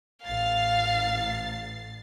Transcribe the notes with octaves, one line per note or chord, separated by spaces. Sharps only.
A1 F5 A6 C7